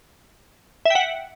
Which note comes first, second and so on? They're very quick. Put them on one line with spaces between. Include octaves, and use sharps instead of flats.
E5 G5 F#5